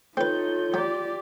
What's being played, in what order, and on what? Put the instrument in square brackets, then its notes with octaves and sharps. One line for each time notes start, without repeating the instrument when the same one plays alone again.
[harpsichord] C4 B4 [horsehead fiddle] D#4 [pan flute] F4 [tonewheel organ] A4 C#5 G6
[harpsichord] F#3 [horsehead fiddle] G4 D5